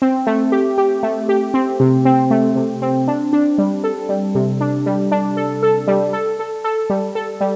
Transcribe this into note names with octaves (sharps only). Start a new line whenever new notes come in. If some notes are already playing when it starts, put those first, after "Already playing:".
C4
A3
G4
G4
A3
G4
C4
C3
C4
A3
C3
C4
D4
D4
G3
A4
G3
C3
D4
G3
D4
A4
A4
G3
A4
A4
A4
G3
A4
G3